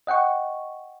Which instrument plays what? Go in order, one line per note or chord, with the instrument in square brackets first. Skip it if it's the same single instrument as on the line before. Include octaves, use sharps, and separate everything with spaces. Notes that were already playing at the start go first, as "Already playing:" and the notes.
[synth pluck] D#5 F#5 G5 C#6